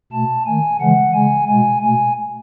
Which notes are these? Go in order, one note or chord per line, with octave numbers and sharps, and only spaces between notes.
B2 A3 A5
D#3 A3 G#5
C#3 E3 G#3 F#5
C#3 G#3 G#5
B2 G#3 G#5
B2 A3 G#5